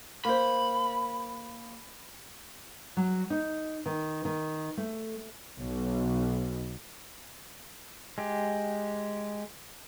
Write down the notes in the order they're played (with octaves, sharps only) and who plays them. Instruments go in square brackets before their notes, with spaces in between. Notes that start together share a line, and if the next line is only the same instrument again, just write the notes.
[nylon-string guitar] A#3 C5 [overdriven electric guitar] B5
[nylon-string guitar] F#3
D#4
D#3
D#3
A3
[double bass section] B1
[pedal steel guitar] G#3 G4